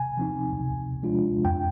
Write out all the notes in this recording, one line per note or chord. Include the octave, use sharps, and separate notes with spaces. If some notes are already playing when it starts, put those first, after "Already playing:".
Already playing: C3 G#5
F3 C4 D#4
C3
F3 G#3 D4 F4
F2 G5